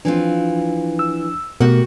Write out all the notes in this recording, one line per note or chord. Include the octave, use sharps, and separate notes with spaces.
E3 F3 C4 D4 F4
E6
B2 A3 F#4 G4 A#4 F#5